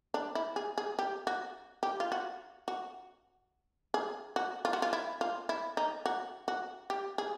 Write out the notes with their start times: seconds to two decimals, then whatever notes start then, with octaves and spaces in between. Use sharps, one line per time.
0.14 D4
0.35 E4
0.56 G#4
0.78 G#4
0.99 G4
1.27 F#4
1.83 G4
2.00 F4
2.12 F#4
2.68 F#4
3.94 G#4
4.36 F#4
4.65 F4
4.73 F#4
4.82 F4
4.93 E4
5.21 F4
5.49 E4
5.77 D#4
6.06 F#4
6.48 F#4
6.90 G4
7.18 G#4